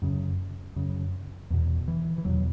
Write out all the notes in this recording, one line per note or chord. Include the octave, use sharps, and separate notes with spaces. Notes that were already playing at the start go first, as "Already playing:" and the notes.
F#2 C#3
F#2 C#3
E2 B2
E3
E3
E2 B2 F#3